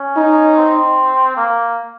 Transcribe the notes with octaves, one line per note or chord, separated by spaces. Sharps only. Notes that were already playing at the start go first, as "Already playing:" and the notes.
Already playing: C#4
D#4
C4
A#3